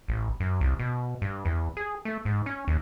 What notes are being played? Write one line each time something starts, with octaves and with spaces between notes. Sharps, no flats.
A1
F#2
C2
B2
G2
E2
G#4
A3
G#2
C#4
D#2